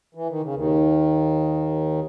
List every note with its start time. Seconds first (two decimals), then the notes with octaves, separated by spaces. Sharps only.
0.15 E3
0.28 D#3
0.42 C#3
0.54 D#2 D#3